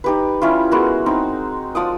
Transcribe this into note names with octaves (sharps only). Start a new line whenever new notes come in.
D#4 G4 B4
G3 C#4 E4 F4
G#3 B3 F#4 A#4
C4 D#4
F3 D5 D#6